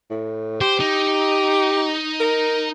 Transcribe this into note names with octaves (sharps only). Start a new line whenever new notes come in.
A2
G4 C5
D#4
A#4